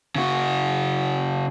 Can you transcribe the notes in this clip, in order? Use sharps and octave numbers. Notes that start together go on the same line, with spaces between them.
C#3 F#4